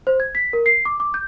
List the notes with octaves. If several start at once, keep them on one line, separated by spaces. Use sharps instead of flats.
C5
G#6
B6
A#4
C7
D6
D6
G6